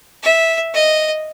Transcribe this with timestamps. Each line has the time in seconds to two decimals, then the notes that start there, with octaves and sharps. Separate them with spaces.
0.23 E5
0.74 D#5